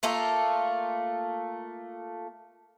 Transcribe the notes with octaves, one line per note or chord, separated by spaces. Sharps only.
A3 A#3 F4 A4